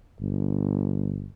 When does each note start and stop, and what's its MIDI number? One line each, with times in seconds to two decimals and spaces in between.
0.20 1.27 31